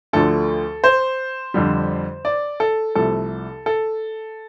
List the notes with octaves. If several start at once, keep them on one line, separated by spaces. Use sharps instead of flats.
D2 D3 F3 A3 A4
C5
F2 D3 G3
D5
A4
C2 C3 F3 A3 A4
A4